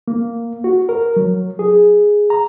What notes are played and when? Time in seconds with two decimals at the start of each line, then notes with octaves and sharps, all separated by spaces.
0.08 A#3
0.64 F#4
0.89 A#4
1.16 F#3
1.59 G#4
2.30 A#5